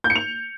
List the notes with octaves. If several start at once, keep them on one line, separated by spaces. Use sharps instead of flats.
G6
C#7
F7